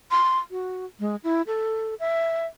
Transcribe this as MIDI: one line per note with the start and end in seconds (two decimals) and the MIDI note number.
0.11 0.38 84
0.51 0.85 66
1.00 1.16 56
1.24 1.42 64
1.47 1.94 69
2.00 2.46 76